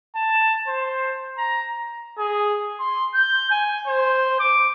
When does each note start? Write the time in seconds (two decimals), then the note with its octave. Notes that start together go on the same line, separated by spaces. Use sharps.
0.15 A5
0.67 C5
1.37 A#5
2.18 G#4
2.80 C6
3.14 G6
3.51 G#5
3.88 C5
4.40 D6